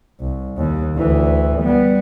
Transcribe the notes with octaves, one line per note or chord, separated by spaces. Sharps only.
C2
D#2
D2 E3
G3 B3